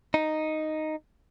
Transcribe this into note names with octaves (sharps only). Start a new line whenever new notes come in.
D#4